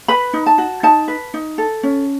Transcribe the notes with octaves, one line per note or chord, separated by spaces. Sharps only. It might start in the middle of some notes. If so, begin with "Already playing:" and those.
B4 B5
D#4
A5
F#4
D#4 A5
B4
D#4
A4
C#4